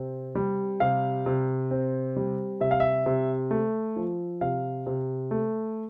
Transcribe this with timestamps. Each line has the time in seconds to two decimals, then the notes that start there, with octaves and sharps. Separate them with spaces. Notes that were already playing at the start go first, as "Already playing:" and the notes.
Already playing: C3 C4
0.35 G3
0.80 C3 F5
1.26 C3
1.71 C4
2.16 G3
2.61 C3 E5
2.71 F5
2.80 E5
3.06 C3
3.51 A3
3.96 F3
4.41 C3 F5
4.87 C3
5.31 A3